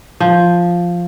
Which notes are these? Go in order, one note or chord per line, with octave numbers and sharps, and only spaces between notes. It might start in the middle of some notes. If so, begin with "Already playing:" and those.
F3